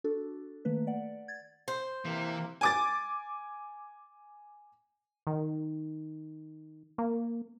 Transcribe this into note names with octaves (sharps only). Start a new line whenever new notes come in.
D4 F#4 A4
D#3 A3 A#3 B4
D5 F#5
G#6 A6
C5
C3 E3 A#3
G#5 D6 A6
D#3
A#3